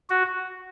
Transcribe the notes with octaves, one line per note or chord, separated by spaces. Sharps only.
F#4